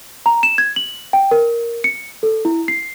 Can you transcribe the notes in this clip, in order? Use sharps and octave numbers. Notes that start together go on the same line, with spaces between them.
A#5
E7
G#6
F#7
G5
A#4
C#7
A4
E4
C7